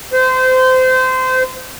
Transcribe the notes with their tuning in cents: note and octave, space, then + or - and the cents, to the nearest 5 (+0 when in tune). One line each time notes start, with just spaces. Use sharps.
C5 -25